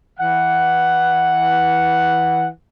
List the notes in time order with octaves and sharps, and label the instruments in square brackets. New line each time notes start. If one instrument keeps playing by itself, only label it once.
[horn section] E3 F#5